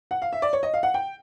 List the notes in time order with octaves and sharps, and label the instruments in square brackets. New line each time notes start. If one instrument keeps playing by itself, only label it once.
[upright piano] F#5
F5
E5
D5
C#5
D#5
F5
F#5
G5